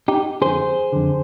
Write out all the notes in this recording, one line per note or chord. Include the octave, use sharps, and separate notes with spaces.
D#4 G4
F2 D3 G#4 C5
F2 D3